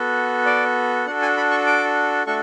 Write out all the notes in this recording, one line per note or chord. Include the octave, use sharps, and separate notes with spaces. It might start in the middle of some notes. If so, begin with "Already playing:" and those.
Already playing: B3 F#4 A4
D5
D4 F#4 A4 F#5
G#5
B5
C#6
D6
A3 D4 F#4 A4 C#6